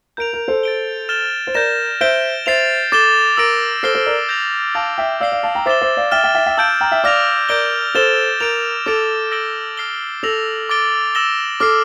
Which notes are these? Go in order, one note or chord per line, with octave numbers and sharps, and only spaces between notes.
A#4 G6 D7 F7
A#4
A4 C5
A6 D7 G7
F6 A6 E7 G7
C5
A#4 D5 G6 A#6 E7
C5 E5 G6 D7 G7
C5 E5 A6 C7 F7
A4 D6 A6 E7 G7
A#4 E6 A#6 D7
A4 C5 F6 C7 G7
A4 C5
A#4 D5
G6 A#6 F7
F5 A5 D6 A6 D7 F7
E5 G5
D5 F5 E6 G6 C7 G7
D5 F5
F5 A5
G5 A#5
C5 E5 D6 A6 E7 G7
C5 E5
D5 F5
E5 G5 F6 A6 E7 G7
E5 G5
E5 G5
E5 G5
F5 A5 E6 G6 D7
G5 A#5
E5 G5
D5 F5 D6 F6 A#6 F7
A#4 D5 G6 D7 G7
A4 C5 A6 E7 G7
A#4 G6 D7 F7
A4 D6 A6 D7 F7
E6 G6 A#6 D7 G7
F6 C7 G7
A4 E6 A#6 F7
D6 A6 D7 G7
E6 A#6 E7 G7
A4 D6 F6 C7